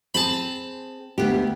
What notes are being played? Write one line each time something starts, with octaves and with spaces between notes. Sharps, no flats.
C4 G#4 A5 B5
D2 B3 G4